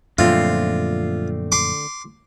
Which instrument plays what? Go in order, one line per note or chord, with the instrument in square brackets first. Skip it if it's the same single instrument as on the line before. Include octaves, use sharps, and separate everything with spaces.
[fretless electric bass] F#2 A#2 F3 [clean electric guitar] D3 A3 C4 [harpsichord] F4
[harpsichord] C6 D6